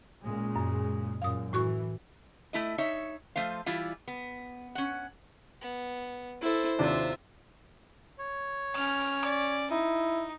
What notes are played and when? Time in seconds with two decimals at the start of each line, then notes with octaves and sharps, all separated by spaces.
0.23 A#2 C#3 G#3
0.56 F#2
1.22 F#2 A#2 F5 D#6
1.53 A2 E3 F#4 C#6
2.53 A3 E4 D#5
2.78 D#4 C#5 E5
3.36 F3 A3 C5 F5
3.66 E3 G3 E4 F4
4.08 B3
4.75 C#4 F#5
5.61 B3
6.41 E4 A4 C5
6.79 D#2 C3 D4 F4 E5
8.19 C#5
8.76 C#4 F6
9.25 D5
9.71 D#4 E4